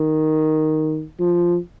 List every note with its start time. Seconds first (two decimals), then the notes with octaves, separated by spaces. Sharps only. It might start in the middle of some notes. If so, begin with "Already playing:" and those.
Already playing: D#3
1.20 F3